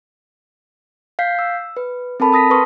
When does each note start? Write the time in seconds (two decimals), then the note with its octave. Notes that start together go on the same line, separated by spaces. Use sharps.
1.19 F5 G6 B6 C7
1.39 E6
1.77 B4
2.20 C4 A4 A#4 A5 B5
2.33 A5 D#6 A#6 B6
2.50 B4 C6 C#6 D#6